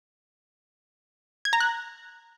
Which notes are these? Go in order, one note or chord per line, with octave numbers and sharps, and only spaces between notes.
G#6
A#5
F#6